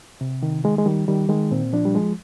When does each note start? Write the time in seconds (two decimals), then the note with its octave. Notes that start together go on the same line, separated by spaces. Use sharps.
0.21 C3
0.43 D#3
0.64 D#3 G#3
0.78 G#3
0.86 D#3 G3
1.08 D#3 G3
1.29 D#3 G#3
1.51 A#2 C4
1.73 F3 D4
1.85 G3
1.95 F3 G#3